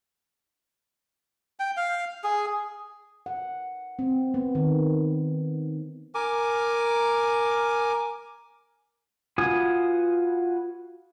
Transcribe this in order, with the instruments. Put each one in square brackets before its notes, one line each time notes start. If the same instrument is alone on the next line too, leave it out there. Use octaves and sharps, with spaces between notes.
[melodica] G5
F5
G#4
[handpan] F#5
C4
B3
D#3
[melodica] A#4 G#5 D6
[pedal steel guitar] F4 F#4 B4 G#5 D#6